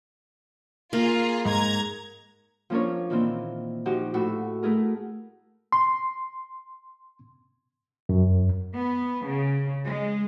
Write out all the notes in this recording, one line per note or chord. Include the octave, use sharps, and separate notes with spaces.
A#3 F4 G#4
G#2 A#5 G#6
F3 A#3 C#4 D4 A#4 C#5
A#2 D#3 E3 A#3 C4 D4
F3 D#4 F#4 G4
A2 E4 F#4 E6
A3 E4 G#4 A#4
C6
F#2
B3
C#3
G#3